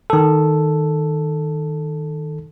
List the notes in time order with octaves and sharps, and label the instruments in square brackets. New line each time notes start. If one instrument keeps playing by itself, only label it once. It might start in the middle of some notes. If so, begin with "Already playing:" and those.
[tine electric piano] D#3 A4